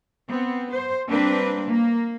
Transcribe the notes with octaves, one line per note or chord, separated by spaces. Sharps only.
B3 C4
C5
G3 A#3 C4 D4 B4
A#3